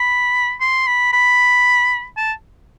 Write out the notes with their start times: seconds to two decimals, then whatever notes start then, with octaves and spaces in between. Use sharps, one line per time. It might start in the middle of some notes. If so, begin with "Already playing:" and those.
Already playing: B5
0.61 C6
0.87 B5
1.13 B5
2.17 A5